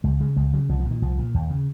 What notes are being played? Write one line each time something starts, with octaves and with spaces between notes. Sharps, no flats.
C#2 G#3
C#3 G#3
C#2 G#3
C#3 F#3
C2 F3
F3
A#2
D#3
C2 F3
A#2
D#2
C#3